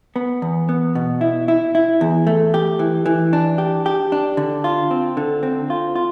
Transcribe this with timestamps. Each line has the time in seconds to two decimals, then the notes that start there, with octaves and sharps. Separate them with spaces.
0.16 B3
0.42 E2
0.69 B3
0.95 B2
1.21 E4
1.48 E4
1.75 E4
2.01 E2
2.27 A3
2.54 G4
2.79 E3
3.06 E3
3.33 D4
3.58 G4
3.86 G4
4.12 D4
4.37 D3
4.64 F4
4.91 C4
5.17 D3
5.43 C4
5.70 F4
5.96 F4